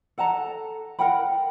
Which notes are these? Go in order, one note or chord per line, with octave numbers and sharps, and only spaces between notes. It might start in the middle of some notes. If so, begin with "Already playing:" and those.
A4 F#5 A5 A#5
A#4 F#5 G5 B5